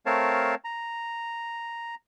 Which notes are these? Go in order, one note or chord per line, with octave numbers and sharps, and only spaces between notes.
A3 C4 A#4 C#5 F5 A5
A#5